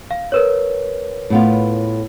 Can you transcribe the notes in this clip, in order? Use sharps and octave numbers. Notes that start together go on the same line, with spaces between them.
F5
A#4 B4 C#5
A2 B3 F4